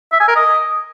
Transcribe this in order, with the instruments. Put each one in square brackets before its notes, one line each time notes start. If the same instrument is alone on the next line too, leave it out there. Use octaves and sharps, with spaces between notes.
[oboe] E5
G#5
A#4
D#5